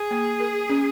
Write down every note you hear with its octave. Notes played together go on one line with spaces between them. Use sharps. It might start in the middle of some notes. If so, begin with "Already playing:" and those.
Already playing: G#4
A#3
A#4
C#4